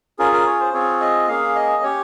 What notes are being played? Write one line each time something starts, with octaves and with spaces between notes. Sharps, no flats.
C#4 F4 G#4 A#4
A#4
C#5
C5
C4 F4 G#4 C#5
D#5
A#3 C#4 G#4 F5
D#5
C#4 G4 C#5